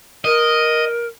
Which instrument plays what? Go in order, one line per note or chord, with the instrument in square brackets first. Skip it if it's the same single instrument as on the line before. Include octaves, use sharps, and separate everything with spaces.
[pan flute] A#4 [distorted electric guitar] D#5